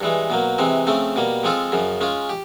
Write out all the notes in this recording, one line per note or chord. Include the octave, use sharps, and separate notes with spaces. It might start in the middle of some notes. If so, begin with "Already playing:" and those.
G2 E3 G#3
B2 F#3 A#3
C3 E3 G#3 C4
C#3 F3 A3 C4
B2 G3 A#3
F3 G#3 C4 F4 A4
F#2 C#3 F3
G#3 C#4 F4
G4